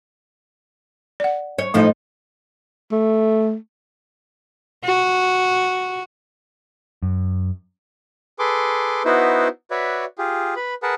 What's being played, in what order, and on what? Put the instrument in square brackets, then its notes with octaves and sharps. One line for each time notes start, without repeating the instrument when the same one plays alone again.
[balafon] D5 F#5
[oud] C#5
[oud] A2 F3 D#4 [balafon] A3
[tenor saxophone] A3
[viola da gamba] F#4
[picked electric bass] F#2
[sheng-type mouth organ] G#4 A4 B4 C6 D6
B3 D#4 E4 F#4 B4 C5
F#4 B4 C#5 D5 E5
F4 G4 G#4
B4 B5
G#4 A#4 B4 F#5 A5